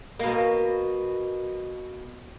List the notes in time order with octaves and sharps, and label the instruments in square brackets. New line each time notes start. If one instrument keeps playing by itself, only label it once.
[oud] B2 A#3